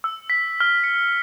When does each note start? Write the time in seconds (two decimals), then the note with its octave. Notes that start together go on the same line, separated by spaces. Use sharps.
0.04 E6
0.30 B6
0.60 F6
0.84 C#7